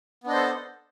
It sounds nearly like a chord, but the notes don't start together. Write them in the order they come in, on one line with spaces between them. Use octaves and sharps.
B3 D4 D#5 C5 A4